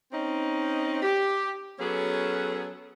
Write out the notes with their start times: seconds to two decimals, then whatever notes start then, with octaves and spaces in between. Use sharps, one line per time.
0.12 C4 C#4 D#4
1.01 G4
1.79 F#3 B3 C#4 G#4 A4